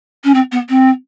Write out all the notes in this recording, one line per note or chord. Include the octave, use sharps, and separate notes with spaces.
C#4
C4
B3
C4